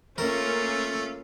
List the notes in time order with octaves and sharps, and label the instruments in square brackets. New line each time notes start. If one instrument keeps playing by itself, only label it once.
[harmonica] A3 [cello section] A#3 C#4 F4 [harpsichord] A#4